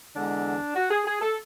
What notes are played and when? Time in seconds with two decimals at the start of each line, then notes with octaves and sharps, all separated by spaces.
0.16 E2 D3 G#3 D4
0.75 F#4
0.90 G#4
1.05 G#4
1.21 A4